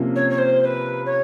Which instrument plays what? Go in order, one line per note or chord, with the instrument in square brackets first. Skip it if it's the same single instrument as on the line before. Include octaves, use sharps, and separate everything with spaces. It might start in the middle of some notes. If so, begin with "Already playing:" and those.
Already playing: [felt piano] C3 F3 A#3 C#4
[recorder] C#5
C#5
C5
C5
B4
C#5